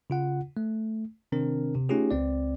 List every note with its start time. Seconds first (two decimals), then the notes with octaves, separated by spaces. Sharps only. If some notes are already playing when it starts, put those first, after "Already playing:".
0.10 C#3 F4 F#5
0.57 A3
1.32 C3 D#3 C4 D4 A#4
1.75 C3
1.89 A3 C#4 D#4 F4 G4 G#4
2.11 C#2 C4 D5